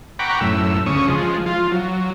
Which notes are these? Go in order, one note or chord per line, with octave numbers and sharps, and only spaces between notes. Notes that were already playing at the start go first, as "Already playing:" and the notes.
F#5 G5 A#5 B5 C#6 D6
F#2 A2 E6
D2 C#3 C#6 D#6
F3 G#3
F3 F4
F#3